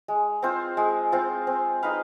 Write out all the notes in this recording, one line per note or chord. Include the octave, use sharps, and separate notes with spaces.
G#3
C4 F4 C5
G#3
C4 F4 C5
C4
D#4 B4 F5